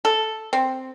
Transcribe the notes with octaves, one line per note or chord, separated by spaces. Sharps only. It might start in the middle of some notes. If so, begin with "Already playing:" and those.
A4
C4